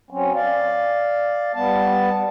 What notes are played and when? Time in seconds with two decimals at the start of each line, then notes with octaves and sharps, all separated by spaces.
0.11 F#3 C4 C#4
0.35 D5 F5
1.55 G3 B3 A5